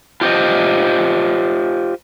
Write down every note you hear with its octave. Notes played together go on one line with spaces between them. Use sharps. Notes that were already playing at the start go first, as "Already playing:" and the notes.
F4 G4 C5 D#5